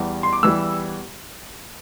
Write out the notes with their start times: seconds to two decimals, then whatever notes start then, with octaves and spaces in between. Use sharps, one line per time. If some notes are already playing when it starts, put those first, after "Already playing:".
Already playing: E2 E3 G3
0.23 C6
0.33 D6
0.43 E2 E3 G3 E6